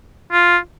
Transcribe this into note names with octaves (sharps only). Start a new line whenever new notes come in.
F4